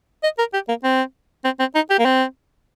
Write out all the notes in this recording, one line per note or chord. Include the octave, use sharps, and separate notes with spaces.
D#5
A#4
G4
A#3
C4
C4
C4
D#4
G4
A#3
C4